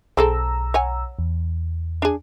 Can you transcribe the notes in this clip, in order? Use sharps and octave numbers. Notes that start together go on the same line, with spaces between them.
B1 C4 G#4 A4 A#5 E6
C#5 F#5 G#5
E2
D4 G#4